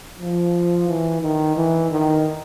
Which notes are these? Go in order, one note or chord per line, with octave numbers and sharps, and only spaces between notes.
F3
E3
D#3
E3
D#3